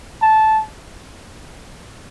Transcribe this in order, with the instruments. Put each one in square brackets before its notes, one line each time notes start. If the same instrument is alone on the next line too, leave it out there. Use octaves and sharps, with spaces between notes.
[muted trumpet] A5